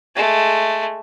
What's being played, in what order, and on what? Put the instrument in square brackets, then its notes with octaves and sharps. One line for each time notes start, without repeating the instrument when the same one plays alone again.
[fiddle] G#3 A3